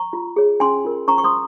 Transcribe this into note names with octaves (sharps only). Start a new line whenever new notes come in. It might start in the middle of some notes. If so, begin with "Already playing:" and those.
Already playing: A#5 C#6
F4
G#4 C#5
C#4 G#5 C6
F4 A#4
C#4 A#5 C#6
C#6
C6 D#6